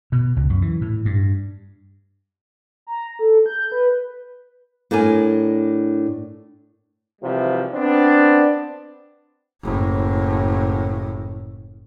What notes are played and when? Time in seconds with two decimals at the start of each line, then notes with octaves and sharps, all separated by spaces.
0.12 B2
0.36 C#2
0.50 F#2
0.62 E3
0.81 A2
1.05 G2
2.87 A#5
3.19 A4
3.46 G6
3.72 B4
4.91 A2 D4 A#4 G#5
7.22 G#1 C3 E3 F3 G3
7.74 B3 C4 D4
9.63 F#1 A2